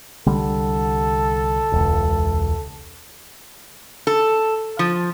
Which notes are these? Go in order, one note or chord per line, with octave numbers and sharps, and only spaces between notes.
C2 D3 G3 A4
E1 C#2
A4
F3